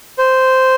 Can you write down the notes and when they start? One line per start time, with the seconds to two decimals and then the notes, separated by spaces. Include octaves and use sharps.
0.19 C5